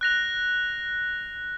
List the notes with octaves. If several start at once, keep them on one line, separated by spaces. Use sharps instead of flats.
F#6 A#6 F7